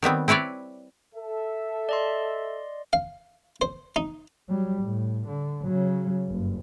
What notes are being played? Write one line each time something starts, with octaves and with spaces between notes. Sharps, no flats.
D#3 G3 B3 C4
C4 E4 B4 C#5 D5
A4 E5
D5 D#5 C6
F5
C5
D#4
F#3 G3
A2
D3
C#3 F#3
F#1 G2